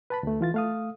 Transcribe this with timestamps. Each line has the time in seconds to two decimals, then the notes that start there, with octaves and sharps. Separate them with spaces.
0.10 B4 A5 B5
0.23 D2 A3
0.41 E3 F4 A6
0.54 A3 F5 D#6